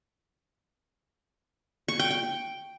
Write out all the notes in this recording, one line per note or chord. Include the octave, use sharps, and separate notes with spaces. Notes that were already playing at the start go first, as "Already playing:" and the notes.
C#6
G5
G5